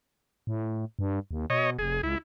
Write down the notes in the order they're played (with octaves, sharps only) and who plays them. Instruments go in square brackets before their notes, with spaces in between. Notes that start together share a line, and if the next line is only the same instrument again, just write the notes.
[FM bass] A2
G2
D#2
[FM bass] B2 [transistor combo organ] C#5 D#5
[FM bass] F1 [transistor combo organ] G#4
[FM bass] C#2 [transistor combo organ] E4